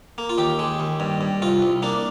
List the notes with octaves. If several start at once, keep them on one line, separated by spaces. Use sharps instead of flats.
A#3
F4
D#2 G4
G#3
D#2
G2
G2
C2 F4
C2
A#3 D4